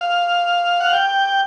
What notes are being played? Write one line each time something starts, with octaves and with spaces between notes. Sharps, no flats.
F5
F#5
G5